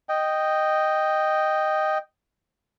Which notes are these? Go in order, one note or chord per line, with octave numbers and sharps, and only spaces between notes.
D#5 G5